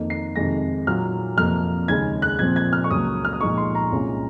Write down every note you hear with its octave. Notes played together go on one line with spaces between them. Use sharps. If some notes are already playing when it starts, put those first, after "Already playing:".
Already playing: F2 D#3 A#3 D#4
C7
F2 C3 D#3 G#3 A#6
A#2 F#3 A#3 F4 F6
F2 C3 F3 A#3 F6
D#2 C#3 G#3 C#4 G#6
F#6
A#2 F3 C4 G#6
G#6
F6
C#6
C#2 C#3 F#3 A#3 D#6
F6
D#6
A#2 F3 G#3 D#4 C#6
C6
A#5
C2 A#2 G#3 C#4 F4